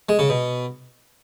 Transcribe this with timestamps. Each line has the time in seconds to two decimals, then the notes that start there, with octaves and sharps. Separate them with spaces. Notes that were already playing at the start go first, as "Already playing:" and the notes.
0.09 G#3
0.19 C#3
0.29 B2